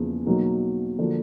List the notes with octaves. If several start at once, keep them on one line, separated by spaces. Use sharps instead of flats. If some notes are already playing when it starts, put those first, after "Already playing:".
Already playing: E2 C#3 F3 A#3
B2 F#3 A#3 D#4
D3 F3 A#3 D4 F#4